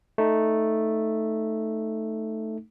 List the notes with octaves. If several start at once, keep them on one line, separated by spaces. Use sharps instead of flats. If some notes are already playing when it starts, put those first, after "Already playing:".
A3 D#4